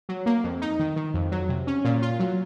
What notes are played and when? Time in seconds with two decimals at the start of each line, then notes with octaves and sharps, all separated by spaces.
0.09 F#3
0.26 A#3
0.44 F2
0.62 D#4
0.79 D#3
0.96 D#3
1.14 F2
1.32 F#3
1.49 C3
1.67 C#4
1.84 A#2
2.02 F4
2.19 F#3